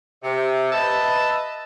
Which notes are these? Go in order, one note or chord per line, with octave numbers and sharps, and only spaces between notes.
C3
B4 D#5 E5 A5